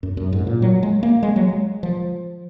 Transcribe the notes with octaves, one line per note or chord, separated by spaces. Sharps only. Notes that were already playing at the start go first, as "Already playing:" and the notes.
F#2
F#2
G#2
A#2
F#3
G#3
A#3
G#3
F#3
G#3
F3